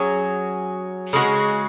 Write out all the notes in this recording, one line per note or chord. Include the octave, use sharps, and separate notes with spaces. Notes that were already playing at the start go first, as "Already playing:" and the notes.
Already playing: F#3 C#4 G#4
C#3 G#3 F#4